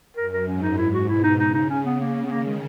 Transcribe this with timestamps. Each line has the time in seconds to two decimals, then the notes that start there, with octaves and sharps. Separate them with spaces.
0.16 F#2 A#4
0.33 A#4
0.47 G#2 C#4
0.62 D#4
0.78 G#2 E4
0.93 F#4
1.08 B2 E4
1.24 D#4
1.39 C#3 D#4
1.54 D#4
1.70 C#4
1.85 B3
2.00 A#3
2.24 B3
2.31 D#3 A#3
2.47 G#3